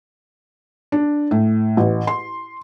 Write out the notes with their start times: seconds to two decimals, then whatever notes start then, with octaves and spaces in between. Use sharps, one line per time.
0.92 D4
1.31 A2
1.77 A1
2.07 C6